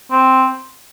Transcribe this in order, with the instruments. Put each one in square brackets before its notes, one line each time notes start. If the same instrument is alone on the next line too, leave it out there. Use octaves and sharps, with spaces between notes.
[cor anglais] C4